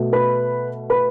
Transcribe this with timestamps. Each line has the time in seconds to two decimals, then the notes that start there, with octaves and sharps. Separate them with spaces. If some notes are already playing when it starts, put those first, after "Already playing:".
Already playing: B2 A3
0.13 B4 B5
0.90 B4 B5